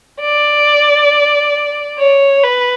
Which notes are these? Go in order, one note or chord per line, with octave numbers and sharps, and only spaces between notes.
D5
C#5
B4